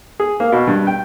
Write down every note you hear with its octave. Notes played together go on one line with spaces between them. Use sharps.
G#4
A#3
B2
G2
G5